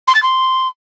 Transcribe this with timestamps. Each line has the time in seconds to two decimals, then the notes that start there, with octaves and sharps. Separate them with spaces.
0.07 C6
0.15 A6
0.22 C6